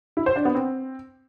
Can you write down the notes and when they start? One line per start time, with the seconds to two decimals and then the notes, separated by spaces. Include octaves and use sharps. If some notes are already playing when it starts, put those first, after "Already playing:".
0.17 E4
0.26 C5
0.36 D4
0.45 B3
0.55 C4